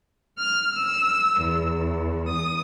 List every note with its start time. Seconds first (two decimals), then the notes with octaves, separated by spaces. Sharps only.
0.37 F6
0.76 E6
1.42 E2
2.29 D#6